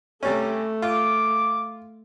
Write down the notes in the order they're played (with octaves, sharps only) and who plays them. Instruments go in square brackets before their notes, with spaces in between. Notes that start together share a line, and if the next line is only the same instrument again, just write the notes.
[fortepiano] C3 G3 C#4 [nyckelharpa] A3
[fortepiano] F4 [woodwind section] D6